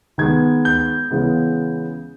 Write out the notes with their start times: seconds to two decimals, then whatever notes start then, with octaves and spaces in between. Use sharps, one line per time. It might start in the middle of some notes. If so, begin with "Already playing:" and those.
0.18 D#3 G#3 B3 G#6
0.65 G6
1.11 C#3 E3 G#3 B3